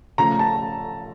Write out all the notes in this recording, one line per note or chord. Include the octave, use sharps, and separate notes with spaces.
C#3 F3 A3 A#5
A5